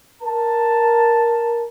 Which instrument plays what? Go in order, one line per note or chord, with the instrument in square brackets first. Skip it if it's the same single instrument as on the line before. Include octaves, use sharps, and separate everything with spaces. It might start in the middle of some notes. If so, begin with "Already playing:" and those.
[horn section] A#4 A5